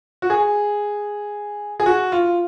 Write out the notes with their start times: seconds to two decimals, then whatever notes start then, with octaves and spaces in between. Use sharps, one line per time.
0.22 F#4
0.30 G#4
1.80 G#4
1.86 F#4
2.12 F4